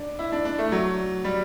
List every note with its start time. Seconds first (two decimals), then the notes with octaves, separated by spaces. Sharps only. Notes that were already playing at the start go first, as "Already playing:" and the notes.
Already playing: D4
0.19 E4
0.32 D4
0.45 D4
0.59 A3
0.72 F#3
1.24 G3